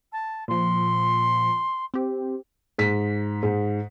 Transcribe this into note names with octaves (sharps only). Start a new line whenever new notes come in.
A5
A#2 F3 C6
C4 G4
G#2 B6
G#2